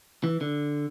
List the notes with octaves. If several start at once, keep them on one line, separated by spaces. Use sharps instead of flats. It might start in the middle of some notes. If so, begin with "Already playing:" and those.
E3
D3